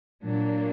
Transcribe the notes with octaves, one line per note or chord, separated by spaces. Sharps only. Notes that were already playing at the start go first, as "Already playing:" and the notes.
A#2 F#3 A#3 D4